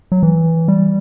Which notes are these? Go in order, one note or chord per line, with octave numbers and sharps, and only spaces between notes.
F#3
E3
G3